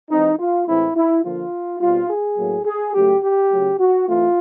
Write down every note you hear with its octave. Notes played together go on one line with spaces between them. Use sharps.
E3 G#3 C4 D#4
F4
A2 E3 G#3 C4 E4
E4
D3 F3 A#3 F4
B2 G3 C4 F4
G#4
A2 F#3 A#3
G#4
C#3 F#3 A3 G4
G4
C#3 F#3 A3
F#4
E3 A3 C4 F4